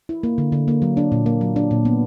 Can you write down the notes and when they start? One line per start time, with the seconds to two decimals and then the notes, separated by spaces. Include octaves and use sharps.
0.09 E4
0.23 A#3
0.38 D3
0.52 D3
0.68 A#3
0.82 F#3
0.97 D4
1.12 A#2
1.26 A#3
1.41 F#3
1.56 D4
1.71 A#2
1.85 B3